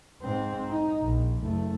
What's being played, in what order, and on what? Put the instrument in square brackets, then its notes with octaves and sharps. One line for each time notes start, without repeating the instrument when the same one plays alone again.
[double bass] G#2 C4
D#4
A#1
F#1 A3